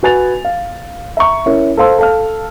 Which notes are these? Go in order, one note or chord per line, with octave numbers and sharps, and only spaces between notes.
F#4 B4 G#5 A6 F7
F5
E5 A#5 C#6
C#4 E4 A#4
A4 C5 F5 C6 E6
A4 F5 F6